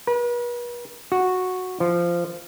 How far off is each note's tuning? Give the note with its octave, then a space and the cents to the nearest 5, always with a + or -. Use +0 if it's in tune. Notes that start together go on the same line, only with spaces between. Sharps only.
B4 -40
F#4 -10
F3 -15